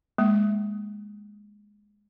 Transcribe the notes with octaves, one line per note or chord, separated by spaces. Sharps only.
G#3 A#3